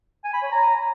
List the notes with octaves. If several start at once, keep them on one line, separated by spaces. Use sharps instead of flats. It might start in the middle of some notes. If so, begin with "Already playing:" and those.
G#5
B5
C#5
A#5